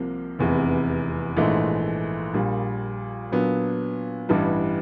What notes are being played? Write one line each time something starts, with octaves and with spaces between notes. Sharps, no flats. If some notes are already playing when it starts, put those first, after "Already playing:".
Already playing: C2 C3 F3 A#3
F1 E2 C3 E3
A#1 G#2 E3 A3
A#1 A#2 G3
A#2 F#3 B3 D4
A1 G2 E3 G3